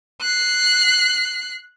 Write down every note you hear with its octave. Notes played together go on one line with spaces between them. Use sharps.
F#6 C7